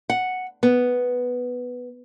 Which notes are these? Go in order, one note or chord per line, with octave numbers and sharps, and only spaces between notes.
F#5
B3